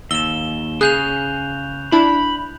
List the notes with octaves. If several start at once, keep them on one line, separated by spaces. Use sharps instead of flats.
D#2 E6 E7 G7
C#3 G#4 F#6 G6 F7
D4 E4 B5